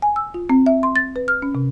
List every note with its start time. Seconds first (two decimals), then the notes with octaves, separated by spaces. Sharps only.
0.02 G#5
0.16 E6
0.34 F4
0.49 C4
0.66 E5
0.83 C6
0.96 A6
1.16 B4
1.28 F6
1.42 C#4
1.55 C3